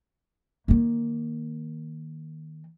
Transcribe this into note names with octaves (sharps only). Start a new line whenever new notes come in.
D#3 A#3